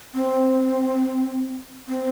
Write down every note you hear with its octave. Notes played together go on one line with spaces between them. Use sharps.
C4
C4